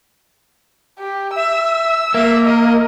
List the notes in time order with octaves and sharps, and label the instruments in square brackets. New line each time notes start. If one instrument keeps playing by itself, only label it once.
[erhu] G4
[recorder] E5 [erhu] E6
[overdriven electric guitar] A#3 [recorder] E5
[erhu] A#4 [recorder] D#5